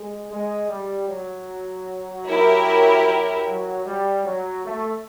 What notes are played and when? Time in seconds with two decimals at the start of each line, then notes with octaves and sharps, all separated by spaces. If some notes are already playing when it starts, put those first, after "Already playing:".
Already playing: G#3
0.30 G#3
0.69 G3
1.08 F#3
2.27 E4 G4 A#4
3.05 F#3
3.45 F#3
3.84 G3
4.24 F#3
4.64 A3